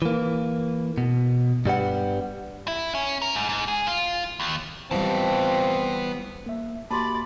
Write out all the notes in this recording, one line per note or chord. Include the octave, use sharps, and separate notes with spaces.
E3 A#3
B2
G2 G3 B3 F#5
E4
C#4
A#4
G#2
G#2
G#4
F4
D#2
E3 F3 G3 B3 C4 A5
A#3 E5
A#3 F#4 G4 D5 A5 B5 C6